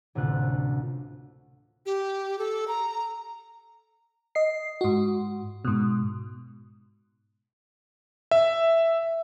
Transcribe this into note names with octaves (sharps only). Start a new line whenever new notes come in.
A1 D2 C3 A#3 F4 F#6
G4
A4
A#5
D#5 C7
G#2 F#4
G#2 B2
E5